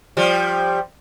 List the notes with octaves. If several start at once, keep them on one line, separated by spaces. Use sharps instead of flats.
F3 G3